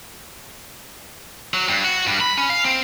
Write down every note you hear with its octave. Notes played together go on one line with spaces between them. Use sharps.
F#3
G2
F#4
G2
B5
C#4
F5
C4